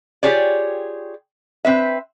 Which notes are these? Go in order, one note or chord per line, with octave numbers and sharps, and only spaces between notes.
F4 G4 G#4 C#5 D5
C4 B4 E5